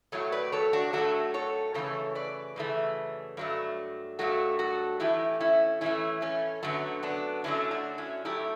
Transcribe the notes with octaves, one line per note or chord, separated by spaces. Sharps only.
A2 F#3 A3 A4 C#5
B4 D5
A4 C#5
D4 F#4
A2 F#3 A3 F#4 A4
A4 C#5
F#2 C#3 E3 A3 A4 C#5
B4 D5
F#2 C#3 E3 A3
G2 F#3 A3
G2 F#3 A3 F#4 A4
F#4 A4
A2 E3 A3 E4 G4
C#4 E4
A2 E3 A3 C#4 E4
A3 C#4
F#2 D3 F#3 A3 B3
B3 D4
F#2 D3 F#3 A3 C#4 E4
D4 F#4
C#4 E4
A2 F#3 A3 E4 G4